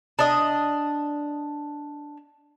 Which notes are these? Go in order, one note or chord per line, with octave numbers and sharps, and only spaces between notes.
D4 D#5